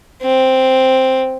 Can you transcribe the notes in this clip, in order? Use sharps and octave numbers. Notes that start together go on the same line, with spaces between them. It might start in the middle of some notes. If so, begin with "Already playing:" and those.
C4